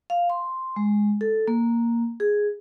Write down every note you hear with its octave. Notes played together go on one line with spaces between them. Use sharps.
F5
C6
G#3
A4
A#3
G#4